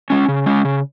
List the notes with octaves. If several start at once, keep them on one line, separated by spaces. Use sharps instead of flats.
G#3 C#4
C#3
G#3 C#4
C#3